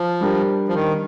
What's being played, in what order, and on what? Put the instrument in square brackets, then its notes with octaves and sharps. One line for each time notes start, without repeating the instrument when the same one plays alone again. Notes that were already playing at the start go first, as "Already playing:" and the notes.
Already playing: [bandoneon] F3
[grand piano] G3 D4 G4 A#4
[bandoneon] F3
D#3